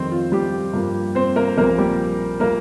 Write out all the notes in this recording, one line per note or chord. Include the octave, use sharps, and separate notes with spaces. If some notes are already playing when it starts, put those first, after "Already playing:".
Already playing: F2 D#3 G3 C4 C5
F4
G3 G4
G2 F3 A#3
C4 C5
A#3 A#4
A#1 A#2 G3 A#3 C4 A#4
G3 G4
A#2 G3 A#3 A#4